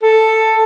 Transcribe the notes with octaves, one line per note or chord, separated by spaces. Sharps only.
A4